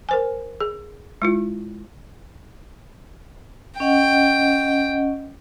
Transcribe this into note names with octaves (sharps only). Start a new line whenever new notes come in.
A#4 C5 G#5
G#4
G#3 E4 F4
C#4 D#5 F#5 G5